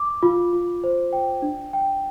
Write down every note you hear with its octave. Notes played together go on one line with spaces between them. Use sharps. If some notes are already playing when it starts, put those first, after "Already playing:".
Already playing: D6
F4
F4
C5
G5
D4
G5